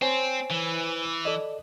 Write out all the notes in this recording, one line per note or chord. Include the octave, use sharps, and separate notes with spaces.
C4 C5 C#5 G#5
E3
A4 D5 D#5